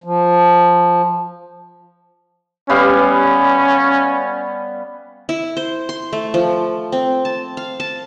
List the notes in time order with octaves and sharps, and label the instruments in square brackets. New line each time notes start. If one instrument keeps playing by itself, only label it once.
[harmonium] F3
[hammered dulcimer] G3 B3 F5 [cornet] C#4
[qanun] E4
C5
C6
A3
F3
C4
A5
F5
A5